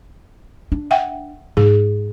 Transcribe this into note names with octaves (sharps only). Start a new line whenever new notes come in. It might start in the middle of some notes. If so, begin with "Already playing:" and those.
D4
E5 F#5 G5
G#2 G#4